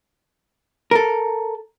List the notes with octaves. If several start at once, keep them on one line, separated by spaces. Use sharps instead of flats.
A4 A#4